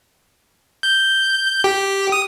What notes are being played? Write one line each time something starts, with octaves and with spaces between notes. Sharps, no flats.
G6
G4
D#6